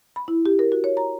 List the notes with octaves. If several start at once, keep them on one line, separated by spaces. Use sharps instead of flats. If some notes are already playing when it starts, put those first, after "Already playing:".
B5
E4
G4
A#4
F#4
C#5
A#5